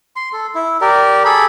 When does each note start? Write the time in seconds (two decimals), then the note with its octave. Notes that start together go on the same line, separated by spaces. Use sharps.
0.16 C6
0.33 A4
0.55 E4
0.81 G4 A#4 D5
1.25 G#4 A4 B5